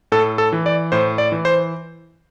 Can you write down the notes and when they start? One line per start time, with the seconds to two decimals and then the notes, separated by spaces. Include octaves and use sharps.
0.12 A2 A4
0.38 A4
0.53 E3
0.66 D5
0.92 A2 C5
1.18 D5
1.32 E3
1.45 C5